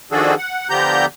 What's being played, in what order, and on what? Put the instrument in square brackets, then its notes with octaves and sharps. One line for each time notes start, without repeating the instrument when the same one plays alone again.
[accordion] D#3 F3 D4 F#4 G#4 A4
F#5
D3 F3 B3 G4 A#5 G6